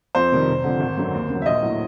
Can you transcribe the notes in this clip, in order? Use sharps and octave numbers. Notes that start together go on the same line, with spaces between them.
F2 C5
C3 D#3 G3
F1
F2 D3
G#1
F#2 D3 F#3
D#2
C#3 F#3
E5
A#1 D#5
A2 F#3